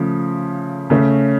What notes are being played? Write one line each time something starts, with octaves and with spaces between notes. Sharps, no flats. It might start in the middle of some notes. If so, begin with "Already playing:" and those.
Already playing: C#3 F3 A3
C#3 A3 C#4